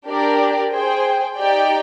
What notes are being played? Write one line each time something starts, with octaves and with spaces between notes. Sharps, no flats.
D4 G4 A#4 D5
G#4 C5 G5
D#4 G4 D5 G5